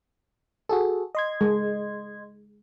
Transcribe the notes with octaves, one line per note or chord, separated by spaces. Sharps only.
F#4 G#4 A4
D#5 C6 G#6
G#3